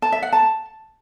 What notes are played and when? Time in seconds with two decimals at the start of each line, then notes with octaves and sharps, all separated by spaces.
0.02 A5
0.12 E5
0.22 F#5
0.32 A5